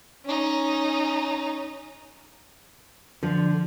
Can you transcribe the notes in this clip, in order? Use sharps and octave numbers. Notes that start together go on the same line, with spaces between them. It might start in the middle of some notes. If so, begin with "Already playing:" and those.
C#4 D#4
D3 F3